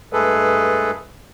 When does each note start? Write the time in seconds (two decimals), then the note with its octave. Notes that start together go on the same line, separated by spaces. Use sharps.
0.13 G2 G#3 A3 G#4 A4 B4